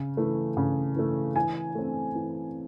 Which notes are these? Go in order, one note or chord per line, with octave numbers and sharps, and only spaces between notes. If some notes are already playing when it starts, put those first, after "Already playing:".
Already playing: C#3
E3 A3
C#3
E3 A3
E3 G#5
A3 C4
E3